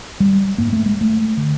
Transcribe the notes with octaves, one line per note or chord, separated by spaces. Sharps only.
G3
G#2 A#3
A3
G#3
A3
D3